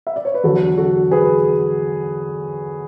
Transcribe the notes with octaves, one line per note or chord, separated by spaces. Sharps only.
E5
D5
C#5
B4
E2 D3 F#3 F#4 A4
F#4 A4
G#4 B4